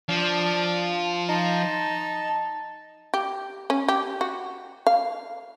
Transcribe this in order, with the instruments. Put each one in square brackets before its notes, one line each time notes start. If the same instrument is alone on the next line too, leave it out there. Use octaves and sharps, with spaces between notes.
[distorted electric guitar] F3 [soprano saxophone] D4
[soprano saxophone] D#4 [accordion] A5
[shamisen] G4
C#4
G4
F#4
F5